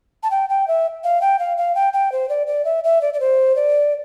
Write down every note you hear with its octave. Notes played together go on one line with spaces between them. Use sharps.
A5
G5
G5
E5
F5
G5
F5
F5
G5
G5
C5
D5
D5
E5
E5
D5
D5
C5
D5